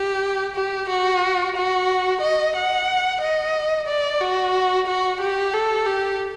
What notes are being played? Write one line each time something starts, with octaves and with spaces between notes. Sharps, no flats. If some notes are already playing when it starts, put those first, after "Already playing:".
Already playing: G4
G4
F#4
F#4
D#5
F#5
D#5
D5
F#4
F#4
G4
A4
G4